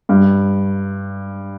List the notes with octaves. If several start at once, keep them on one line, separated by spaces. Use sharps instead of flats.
G2